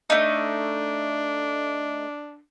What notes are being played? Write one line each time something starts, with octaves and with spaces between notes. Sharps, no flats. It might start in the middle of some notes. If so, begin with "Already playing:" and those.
A3 D4 D#4